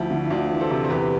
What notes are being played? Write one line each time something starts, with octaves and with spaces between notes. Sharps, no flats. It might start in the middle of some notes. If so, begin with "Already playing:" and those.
Already playing: D2 F3 E4
D3
E4
D2 D4 F4
E3
A4 C5
C3
C5
E2 G4 B4